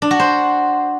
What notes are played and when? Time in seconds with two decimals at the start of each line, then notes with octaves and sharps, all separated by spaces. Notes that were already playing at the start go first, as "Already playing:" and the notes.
0.02 D4
0.11 F#4
0.19 C5